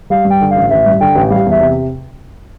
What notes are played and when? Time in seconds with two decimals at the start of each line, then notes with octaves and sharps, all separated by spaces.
0.10 G3 F5
0.25 G2
0.31 G5
0.41 D3
0.51 A1 F5
0.70 A1 E5
0.86 G2
1.01 D3 G5
1.15 A1
1.30 G3 F5
1.46 E2 E5
1.61 C3